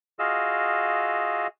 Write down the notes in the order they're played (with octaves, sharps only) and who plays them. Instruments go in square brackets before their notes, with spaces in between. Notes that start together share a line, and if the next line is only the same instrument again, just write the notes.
[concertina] F4 F#4 G#4 D#5 F5 E6